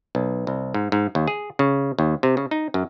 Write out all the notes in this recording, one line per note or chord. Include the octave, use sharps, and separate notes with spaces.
B1
C2
G#2
G#2
D#2
G#4
C#3
D#2
C3
C#3
D#4
F#2